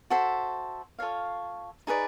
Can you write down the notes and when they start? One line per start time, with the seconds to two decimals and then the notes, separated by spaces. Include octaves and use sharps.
0.10 F#4 A4 C5 E5
0.98 F4 A4 C#5 F5
1.87 D#4 G#4 B4 D5